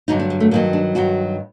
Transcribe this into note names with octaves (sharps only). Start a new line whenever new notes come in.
G2 D3 F#3 D#4
D4
G3
A3
G2 D#3 F#3 A#3
D4
G2 D#3 F#3 F#4